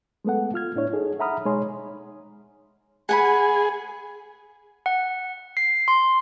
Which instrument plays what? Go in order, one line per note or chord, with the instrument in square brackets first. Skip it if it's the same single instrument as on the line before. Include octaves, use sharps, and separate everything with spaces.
[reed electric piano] G#3 A3 B3 A4 F#5
F4 F6 G#6
A2 D4 E4 C#5
D#4 G#4 A4
E5 F#5 A#5 B5 D#6 F6
B2 G#3 D#4 C#5 G#5 C6
[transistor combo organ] G#4 [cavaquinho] F#5 G#5 B5
[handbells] F#5
C7
C6